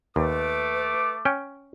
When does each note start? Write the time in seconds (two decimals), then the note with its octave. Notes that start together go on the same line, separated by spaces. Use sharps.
0.16 D#2 A3 B4 D6
1.25 C#4 G5